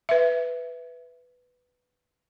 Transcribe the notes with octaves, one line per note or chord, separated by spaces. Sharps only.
B4 E5